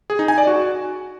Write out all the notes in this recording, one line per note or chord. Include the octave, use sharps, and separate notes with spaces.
G#4
D#4
G#5
D5
F#4